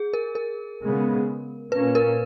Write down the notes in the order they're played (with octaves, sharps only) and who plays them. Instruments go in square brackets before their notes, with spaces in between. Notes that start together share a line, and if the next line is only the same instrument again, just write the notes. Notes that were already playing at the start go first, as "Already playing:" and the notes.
Already playing: [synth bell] G#4
A#4
A#4
[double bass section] C#3 G#3 B3
[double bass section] A#2 A#3 C#4 [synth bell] B4
[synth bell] A#4